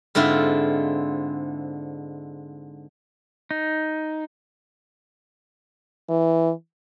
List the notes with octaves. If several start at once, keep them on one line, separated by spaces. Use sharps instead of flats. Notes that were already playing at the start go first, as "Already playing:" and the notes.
G#2 D3 C4 E4 F4
D#4
E3